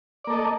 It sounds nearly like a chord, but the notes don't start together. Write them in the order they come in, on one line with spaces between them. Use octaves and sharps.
D5 A#3 A4 D#5